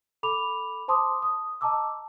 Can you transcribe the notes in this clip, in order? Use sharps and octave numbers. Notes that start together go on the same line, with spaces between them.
A4 B5 D6 F7
C5 A5 C6 D6 D#6
D#6
D#5 A5 A#5 D6 E6